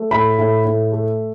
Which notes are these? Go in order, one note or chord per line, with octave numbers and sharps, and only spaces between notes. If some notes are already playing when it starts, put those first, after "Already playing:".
Already playing: A3
A2 B5
A2
A2
A3